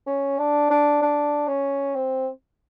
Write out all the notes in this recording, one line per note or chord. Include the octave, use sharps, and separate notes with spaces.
C#4
D4
D4
D4
C#4
C4